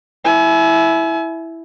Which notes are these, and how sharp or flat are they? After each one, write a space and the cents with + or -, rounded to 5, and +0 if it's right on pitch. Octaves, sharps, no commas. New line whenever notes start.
E4 +0 G#5 +35